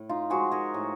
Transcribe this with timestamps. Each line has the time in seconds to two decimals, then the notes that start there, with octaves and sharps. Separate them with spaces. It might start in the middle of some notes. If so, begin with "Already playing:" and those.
Already playing: A2
0.09 D#4 F4
0.30 F3 G#3 F#4 G#4
0.52 G#4 A#4
0.74 A2